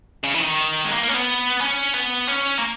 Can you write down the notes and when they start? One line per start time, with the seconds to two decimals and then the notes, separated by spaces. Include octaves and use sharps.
0.24 C#3
0.34 E3
0.41 D#3
0.85 G#3
0.92 A#3
1.03 A#3
1.09 C#4
1.14 B3
1.60 C#4
1.94 B3
2.27 C#4
2.58 A#3